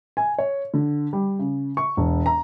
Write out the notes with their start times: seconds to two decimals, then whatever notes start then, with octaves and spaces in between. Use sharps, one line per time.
0.17 G#5
0.38 C#5
0.74 D3
1.13 G3
1.39 C#3
1.77 C#6
1.97 E1
2.26 A#5